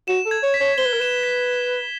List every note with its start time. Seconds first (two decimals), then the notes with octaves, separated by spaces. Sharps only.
0.08 F#4 E7
0.26 A4
0.31 G#6
0.43 C#5
0.54 B6
0.61 C#5
0.78 C5 G7
0.85 B4
0.93 A#4
1.00 B4 E7
1.24 B6